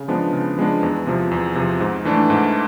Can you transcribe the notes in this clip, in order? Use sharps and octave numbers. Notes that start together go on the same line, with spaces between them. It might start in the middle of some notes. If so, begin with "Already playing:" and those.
Already playing: C#3
F3 G#3 B3 D4
C#3
F3 G#3 B3 D4
E2
C3 F3
E2
C3 F3
G#2
E3 A3 D4
G#2